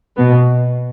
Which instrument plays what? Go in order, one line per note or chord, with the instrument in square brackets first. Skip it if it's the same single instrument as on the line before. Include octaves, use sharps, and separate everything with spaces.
[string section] B2 B3